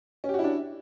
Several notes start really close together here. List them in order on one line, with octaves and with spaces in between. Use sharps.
C#4 G4 F#4 E4 D4